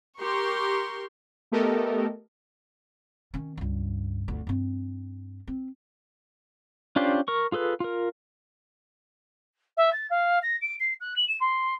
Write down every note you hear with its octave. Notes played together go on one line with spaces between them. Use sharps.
G4 A#4 C6 C#6
A3 B3 G4 A4 A#4 D#5
D#3 C#4
C#2 G2
G1 D2
G2 C4
C4
C#4 D4 F4 G4 C5
A#4 C#6
F4 G#4 A4 B4
F4 A#4
E5
A6
F5
A#6
D7
C7
F#6
F#7
E7
C6